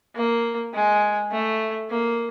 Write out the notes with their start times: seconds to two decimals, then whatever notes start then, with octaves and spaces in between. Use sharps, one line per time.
0.16 A#3
0.74 G#3
1.31 A3
1.90 A#3